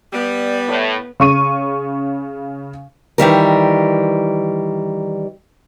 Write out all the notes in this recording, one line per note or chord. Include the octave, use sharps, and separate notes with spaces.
G3 B3 D5
A2
C#3 C#6 D#7
D#3 E3 G3 A#4